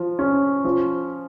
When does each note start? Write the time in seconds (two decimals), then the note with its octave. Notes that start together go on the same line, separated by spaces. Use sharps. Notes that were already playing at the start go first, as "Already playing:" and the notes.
Already playing: F3
0.19 C#4
0.65 F3